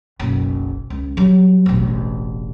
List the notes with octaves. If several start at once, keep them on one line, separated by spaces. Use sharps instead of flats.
F#1 B1
C#2
F#3 G3
E1 A1